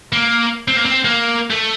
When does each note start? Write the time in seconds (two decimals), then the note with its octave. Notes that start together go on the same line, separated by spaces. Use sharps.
0.13 A#3
0.68 C4
0.77 A#3
0.85 C4
1.05 A#3
1.51 A3